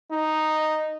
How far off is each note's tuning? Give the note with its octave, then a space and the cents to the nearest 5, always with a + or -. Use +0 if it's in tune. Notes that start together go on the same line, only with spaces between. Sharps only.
D#4 -5